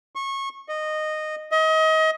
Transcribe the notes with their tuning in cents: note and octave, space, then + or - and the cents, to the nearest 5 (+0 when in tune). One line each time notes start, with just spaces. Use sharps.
C#6 -25
D#5 -15
D#5 +30